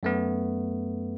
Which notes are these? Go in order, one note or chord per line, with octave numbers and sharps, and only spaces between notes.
F#2 A3 B3